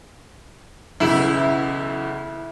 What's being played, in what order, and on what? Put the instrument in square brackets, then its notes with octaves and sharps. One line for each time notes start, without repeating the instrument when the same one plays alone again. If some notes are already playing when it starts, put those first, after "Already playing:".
[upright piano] B1 C#3 E3 [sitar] E4